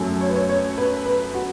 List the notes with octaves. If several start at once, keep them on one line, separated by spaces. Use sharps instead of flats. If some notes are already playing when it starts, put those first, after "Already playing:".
Already playing: F#2 F#3 A3
C#5
B4
C#5
C#5
B4
B4
F#4